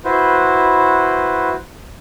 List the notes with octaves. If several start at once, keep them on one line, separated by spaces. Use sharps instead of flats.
E4 F#4 B4 C5